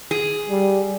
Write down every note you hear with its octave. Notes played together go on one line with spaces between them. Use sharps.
G#4
G3